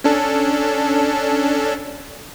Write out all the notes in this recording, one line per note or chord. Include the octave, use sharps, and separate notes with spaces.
C#4 D4 A4